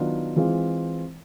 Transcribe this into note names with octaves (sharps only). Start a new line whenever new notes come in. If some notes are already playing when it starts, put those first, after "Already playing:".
Already playing: D#3 F#3 B3 D4 F4
E3 G#3 C4 F4